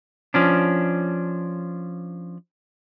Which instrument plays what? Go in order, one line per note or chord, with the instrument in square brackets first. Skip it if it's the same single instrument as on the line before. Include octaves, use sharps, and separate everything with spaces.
[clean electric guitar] F3 C#4 D4